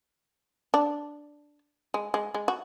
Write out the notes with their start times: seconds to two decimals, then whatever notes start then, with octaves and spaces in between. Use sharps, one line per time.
0.74 D4
1.94 G#3
2.14 G#3
2.34 G#3
2.48 F#4